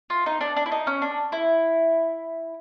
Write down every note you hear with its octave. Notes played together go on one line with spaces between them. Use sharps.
F4
D#4
D4
D4
E4
D#4
C#4
D4
E4